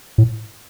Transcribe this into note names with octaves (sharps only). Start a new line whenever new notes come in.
A2